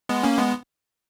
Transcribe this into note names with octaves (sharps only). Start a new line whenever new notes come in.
G#3 B3
A#3 C#4
G#3 B3